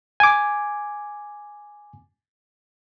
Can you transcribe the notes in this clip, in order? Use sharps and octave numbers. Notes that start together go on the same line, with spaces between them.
G#5 D6